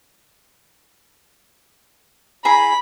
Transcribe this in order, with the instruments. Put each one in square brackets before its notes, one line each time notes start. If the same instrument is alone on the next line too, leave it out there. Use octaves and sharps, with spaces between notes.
[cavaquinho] E4 G#4 A#5 [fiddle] B5